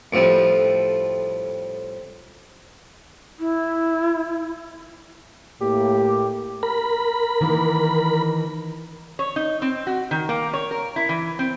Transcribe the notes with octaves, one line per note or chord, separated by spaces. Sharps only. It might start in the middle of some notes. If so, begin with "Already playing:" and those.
F2 A2 F3 G3
E4
A2 A#3 G4
A#4 B5
D#3 E3 A#3
C#5
D#4
C4
F#4
D#3
A#3
C#5
A#4
E4
E3
C4